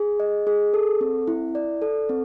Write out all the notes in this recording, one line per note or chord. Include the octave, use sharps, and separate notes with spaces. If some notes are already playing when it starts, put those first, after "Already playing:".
Already playing: G#4
D#5
G#4
A4
C4
E4
D5
A4
C4